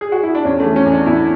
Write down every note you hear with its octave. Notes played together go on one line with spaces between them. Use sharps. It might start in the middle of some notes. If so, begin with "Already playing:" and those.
G#4
F#4
E4
D4
E2 C#4
A3
E3
C#4
E2
D4
E2 E4